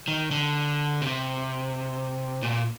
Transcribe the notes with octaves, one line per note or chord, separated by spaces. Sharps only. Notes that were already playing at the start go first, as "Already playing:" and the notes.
D#3
D3
C3
A#2